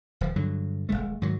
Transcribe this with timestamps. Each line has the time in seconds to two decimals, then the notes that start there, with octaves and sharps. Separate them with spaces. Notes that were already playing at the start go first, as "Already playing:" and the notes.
0.21 D1 F3
0.36 G2 D3 F#3
0.89 D#1 G#1 G#3 A3
1.22 G#2 D#3 F#3